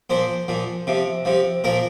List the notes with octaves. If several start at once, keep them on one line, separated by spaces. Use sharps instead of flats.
A#2 F3 C5
A#2 F3
C3 F3
C3 F3
A#2 F3 A#4